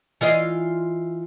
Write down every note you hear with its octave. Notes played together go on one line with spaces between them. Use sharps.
E3 F4 D#5